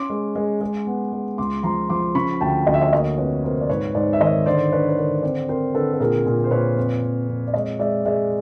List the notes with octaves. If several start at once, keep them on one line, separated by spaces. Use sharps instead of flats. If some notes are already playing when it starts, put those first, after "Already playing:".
Already playing: C#4 C6 D6
G#3
G#3
G#3
B3
G#3
C#2 C6 D6
F3 A#5 C6
F3 C6 D6
C#3 B5 C#6
D2 G5 A5
D2 D#5
E5
C#5 D#5
A#3 C#5 D#5
F2 B4 C#5
C3 A#4 C5
D5
G#2 B4 C#5
G#2 C5 D5
E5
D#3 C#5 D#5
D3 C5 D5
D4 B4 C#5
B4
D3 A#4 C5
C4 C5 D5
C4 A#4 C5
D3 A4 B4
A4
A#2 G#4 A#4
A#2
C5
A#2 B4 C#5
F2
F2
F2
D5
G#3 C#5 D#5
G#3 D5 E5
G#3 D5 E5